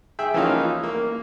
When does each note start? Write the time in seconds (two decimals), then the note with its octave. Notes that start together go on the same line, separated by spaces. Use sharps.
0.19 G#4 E5 G5
0.34 E3 F3 A#3 C#4 D#4 F4
0.83 A#3